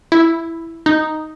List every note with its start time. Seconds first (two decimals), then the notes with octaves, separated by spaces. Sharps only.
0.12 E4
0.86 D#4